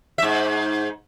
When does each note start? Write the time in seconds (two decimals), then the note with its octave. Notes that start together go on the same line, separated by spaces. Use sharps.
0.18 G#2 E5